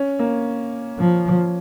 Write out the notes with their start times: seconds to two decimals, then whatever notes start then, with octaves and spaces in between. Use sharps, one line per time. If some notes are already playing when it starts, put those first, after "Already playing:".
Already playing: C#4
0.19 A#3
0.99 F3